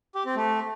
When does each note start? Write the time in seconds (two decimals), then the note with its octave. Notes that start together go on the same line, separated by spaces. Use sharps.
0.15 G4
0.25 C4
0.36 A3